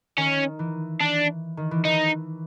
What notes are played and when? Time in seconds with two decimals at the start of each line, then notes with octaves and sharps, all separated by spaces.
0.17 D#3 C#4
0.59 E3
1.01 D4
1.57 D#3
1.71 E3
1.85 E3 D#4